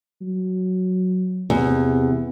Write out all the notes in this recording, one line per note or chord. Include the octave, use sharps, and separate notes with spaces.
F#3
E2 C3